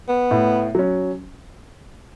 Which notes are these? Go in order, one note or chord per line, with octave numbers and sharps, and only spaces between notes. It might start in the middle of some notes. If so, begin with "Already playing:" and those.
B3
A2
F#3 C#4